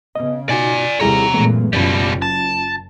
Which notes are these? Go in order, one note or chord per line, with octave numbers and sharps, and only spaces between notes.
C#3 B3 D#5
B2 D#4 F#4 D5 G#5
D#2 C3 G3 E4 G#4 A4 C#5 A#5
F#2 A#2 E3 G#3 A3 B3
F#1 F#2 B2 G3 C#4 F4
A5